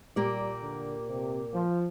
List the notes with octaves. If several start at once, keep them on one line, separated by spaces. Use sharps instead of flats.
A#2 G3 A#3 G4 D5
D3
C3
F3